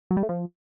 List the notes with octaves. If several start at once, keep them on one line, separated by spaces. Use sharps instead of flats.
F#3
G3
A3
F3